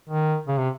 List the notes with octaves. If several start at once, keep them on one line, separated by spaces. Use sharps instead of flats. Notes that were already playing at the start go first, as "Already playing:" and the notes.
D#3
C#3
C3